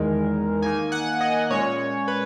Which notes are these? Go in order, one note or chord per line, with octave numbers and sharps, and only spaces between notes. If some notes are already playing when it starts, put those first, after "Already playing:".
Already playing: E2 D#3 G#3 D#4 A#4
D#3 A#3 D#4 G#5
F#5
D#5
A#2 G#3 C#4 C#5
B4